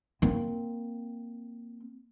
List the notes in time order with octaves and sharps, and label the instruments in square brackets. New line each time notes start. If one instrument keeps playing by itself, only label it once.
[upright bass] A#3 C4